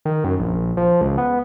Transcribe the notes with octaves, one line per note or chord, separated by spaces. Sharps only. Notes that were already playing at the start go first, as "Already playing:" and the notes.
D#3
F#2
A#1
F3
C#2
B3